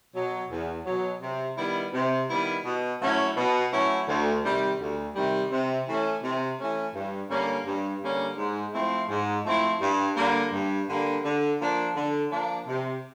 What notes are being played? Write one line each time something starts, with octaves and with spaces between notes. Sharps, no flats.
B2 F#3
E2
B2 F#3
C3
D#3 G3 B3 E4
C3
D#3 G3 B3 E4
B2
F#3 A3 C#4 E4
B2
F#3 A3 C#4 E4
D2
C3 D#3 G3
D2
C3 D#3 G3
C3
E3 A3 C#4
C3
E3 A3 C#4
G2
D3 G3 A#3 C#4
G2
D3 G3 A#3 C#4
G#2
F3 A3 C4 E4
G#2
F3 A3 C4 E4
G2
D3 G3 A#3
G2
D3 G3 A#3
D3
F3 A#3 D4
D3
F3 A#3 D4
C3